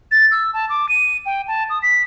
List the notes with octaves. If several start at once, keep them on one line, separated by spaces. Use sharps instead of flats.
A6
E6
A5
D6
D#7
G5
A5
D#6
B6